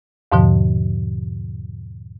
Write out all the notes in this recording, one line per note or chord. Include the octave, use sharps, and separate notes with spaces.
E2 G#2 B2 D3 F3